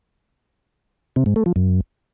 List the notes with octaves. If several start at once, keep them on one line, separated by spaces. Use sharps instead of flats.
C3
G#2
A3
F3
F#2